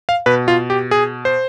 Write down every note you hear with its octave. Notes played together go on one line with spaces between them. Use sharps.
F5
B2 B4
F4
G4
G#4
C5